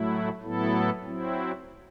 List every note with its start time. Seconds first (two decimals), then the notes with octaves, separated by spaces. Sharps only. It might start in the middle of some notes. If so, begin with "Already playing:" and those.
Already playing: A2 F#3 A3 E4
0.41 A2 F#3 B3 E4 A4
1.03 F#3 C4 E4